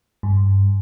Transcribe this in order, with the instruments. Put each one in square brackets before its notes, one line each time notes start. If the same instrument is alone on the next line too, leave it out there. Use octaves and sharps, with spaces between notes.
[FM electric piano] G2